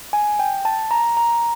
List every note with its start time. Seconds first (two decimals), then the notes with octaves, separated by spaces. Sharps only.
0.13 G#5
0.39 G5
0.65 A5
0.91 A#5
1.17 A#5